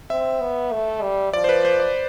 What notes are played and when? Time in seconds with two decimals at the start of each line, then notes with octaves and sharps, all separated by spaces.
0.10 C4 E5
0.41 B3
0.72 A3
1.02 G3
1.33 F3 D5
1.44 C5
1.49 B4
1.65 C5
1.80 D5